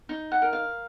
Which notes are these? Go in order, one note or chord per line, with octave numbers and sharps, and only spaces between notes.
D#4
F#5
A#4
F5